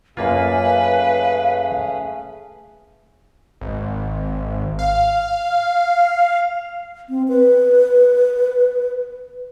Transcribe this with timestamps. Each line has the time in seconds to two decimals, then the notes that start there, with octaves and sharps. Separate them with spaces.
0.17 F#2 A3 A#3 C#4 F4 G#4 B4 F5
3.61 G#1
4.79 F5
7.09 C4
7.28 B4